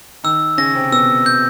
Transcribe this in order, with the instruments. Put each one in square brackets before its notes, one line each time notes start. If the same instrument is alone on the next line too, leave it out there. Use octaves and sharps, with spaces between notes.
[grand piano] D#3 D#4 [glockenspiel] E6
[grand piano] C#3 C#4 [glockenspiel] A#6
[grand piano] C3 C4
[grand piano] B2 B3 [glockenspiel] E6
[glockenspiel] G6